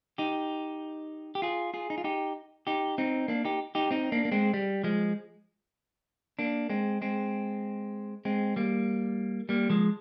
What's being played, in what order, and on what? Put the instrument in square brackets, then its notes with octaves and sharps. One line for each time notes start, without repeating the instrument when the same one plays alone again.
[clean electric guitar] D#4 G4
G4
F4 G#4
F4 G#4
D#4
F4
D#4 G4
D#4 G4
C4 D#4
A#3 D4
D#4 G4
D#4 G4
C4 D#4
A#3 D4
A#3
G#3 C4
G3
F3 G#3
A#3 D4
G#3 C4
G#3 C4
G#3 C4
G3 A#3
G3 A#3
F3 G#3